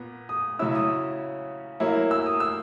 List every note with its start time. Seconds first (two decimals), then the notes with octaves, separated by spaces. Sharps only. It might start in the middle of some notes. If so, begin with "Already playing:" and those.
Already playing: A#2 B3
0.29 D#6
0.59 C#3 F#3 C#4 E4 E6
0.75 D#6
1.80 F#3 A#3 E4
2.11 E6
2.26 D#6
2.40 E6